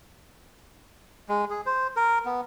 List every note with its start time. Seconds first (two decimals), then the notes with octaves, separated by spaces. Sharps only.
1.29 G#3
1.50 G#4
1.66 C5
1.96 A#4
2.25 B3